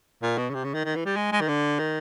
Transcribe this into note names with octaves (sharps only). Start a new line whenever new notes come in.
A#2
B2
C#3
C3
C#3
D#3
D#3
E3
G3
G#3
G#3
D#3
D3
D#3